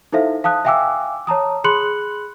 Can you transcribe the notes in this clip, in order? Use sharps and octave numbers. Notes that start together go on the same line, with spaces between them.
D#4 E4 A4 C5 E5 F5
F5 A5 D#6 F#6
E5 F5 G5 G#5 D6 E6
C#5 A5 A#5 D#6
G#4 B5 C6 F#6 C#7 F#7